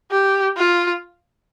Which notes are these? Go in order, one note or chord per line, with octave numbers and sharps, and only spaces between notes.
G4
F4